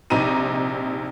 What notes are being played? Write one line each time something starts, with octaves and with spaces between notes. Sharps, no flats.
A#1 C3 D#4 A#5 D#7